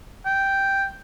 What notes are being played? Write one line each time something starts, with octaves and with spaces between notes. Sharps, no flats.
G5